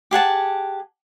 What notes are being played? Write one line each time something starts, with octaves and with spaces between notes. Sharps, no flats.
G4 G#4 F#5 A5